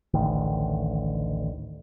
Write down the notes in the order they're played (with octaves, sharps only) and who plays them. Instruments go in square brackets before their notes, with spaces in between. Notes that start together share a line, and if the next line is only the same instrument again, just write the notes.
[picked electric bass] A1 D2 D#3